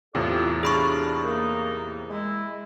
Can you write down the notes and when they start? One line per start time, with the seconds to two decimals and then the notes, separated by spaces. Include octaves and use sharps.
0.15 E2 A2 C3 F4 A4 D5
0.63 D4 F4 G#4 B5 C#6
1.24 A#3 D#4
2.10 G#3 E4